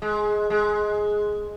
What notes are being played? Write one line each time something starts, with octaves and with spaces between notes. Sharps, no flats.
G#3
G#3